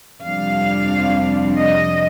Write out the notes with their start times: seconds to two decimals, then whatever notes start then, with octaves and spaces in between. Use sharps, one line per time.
0.23 F2 C3 G3 D4 F5
1.59 D#5